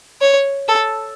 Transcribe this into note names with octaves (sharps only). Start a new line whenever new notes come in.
C#5
A4